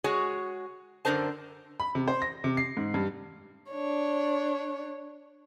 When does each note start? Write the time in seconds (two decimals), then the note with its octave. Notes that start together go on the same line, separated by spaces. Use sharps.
0.04 G#3 F#4 G#4 C#5
1.05 F#2 D3 D4 A#4 C5 A5
1.80 B5
1.95 C3
2.08 C5
2.22 A#6
2.44 C3
2.57 C7
2.77 G#2
2.94 G2
3.71 D4 C#5